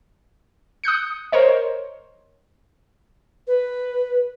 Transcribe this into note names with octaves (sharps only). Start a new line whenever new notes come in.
D#6 F#6 G6 C#7
A#4 C5 C#5 D#5
B4